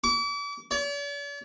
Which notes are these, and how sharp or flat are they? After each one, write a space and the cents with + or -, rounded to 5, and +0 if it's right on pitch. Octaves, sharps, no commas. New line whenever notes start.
D6 -40
D5 -45